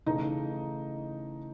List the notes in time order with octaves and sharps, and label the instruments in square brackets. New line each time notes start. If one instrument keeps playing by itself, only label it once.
[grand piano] C#3 E3 A3 [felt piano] D#4